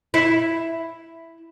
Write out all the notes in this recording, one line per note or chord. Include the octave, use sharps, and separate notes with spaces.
E4